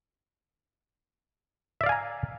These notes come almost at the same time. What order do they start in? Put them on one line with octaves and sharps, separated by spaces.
E5 D5 F5 G#5 A#5